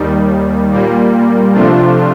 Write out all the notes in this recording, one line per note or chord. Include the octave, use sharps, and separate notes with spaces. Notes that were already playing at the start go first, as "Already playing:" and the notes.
Already playing: D#2 D#3 G3
A#2 G3 A#3
C3 F3 A3 D4 F4